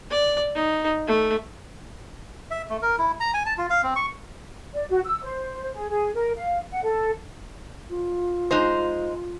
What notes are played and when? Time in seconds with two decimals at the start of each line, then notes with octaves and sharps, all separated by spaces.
0.11 D5
0.55 D#4
1.07 A3
2.51 E5
2.70 A3
2.82 A#4
2.99 E4
3.20 A#5
3.34 G#5
3.46 A5
3.58 F4
3.70 F5
3.83 C4
3.96 C#6
4.73 D5
4.89 F#4
5.04 E6
5.24 C5
5.74 G#4
5.89 G#4
6.15 A#4
6.37 F5
6.71 F#5
6.84 A4
7.90 F4
8.51 G#3 D#4 C5